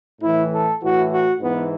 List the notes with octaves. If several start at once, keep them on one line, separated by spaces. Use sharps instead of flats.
A2 E3 E4
A4
A2 E3 F#4
F#4
G#2 E3 B3